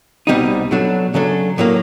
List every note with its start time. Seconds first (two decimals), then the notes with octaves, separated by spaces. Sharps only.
0.27 C2 B2 G3 C4 D#4
0.71 B2 F#3 A3 D4
1.14 C#3 F#3 A3 D4
1.58 A2 F#3 A#3